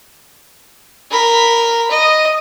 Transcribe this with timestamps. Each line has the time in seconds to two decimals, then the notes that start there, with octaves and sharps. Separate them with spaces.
1.11 A#4 B5
1.91 D#5